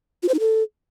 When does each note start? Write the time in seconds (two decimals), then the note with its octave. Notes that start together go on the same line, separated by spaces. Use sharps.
0.23 F4
0.28 C5
0.34 D#4
0.40 A4